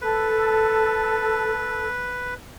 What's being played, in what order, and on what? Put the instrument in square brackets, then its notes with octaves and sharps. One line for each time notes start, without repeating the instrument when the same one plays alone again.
[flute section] A4 [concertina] B4